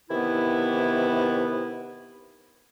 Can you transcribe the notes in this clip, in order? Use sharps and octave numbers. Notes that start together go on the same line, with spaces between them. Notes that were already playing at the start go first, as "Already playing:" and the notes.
C3 D#3 E3 B3 E4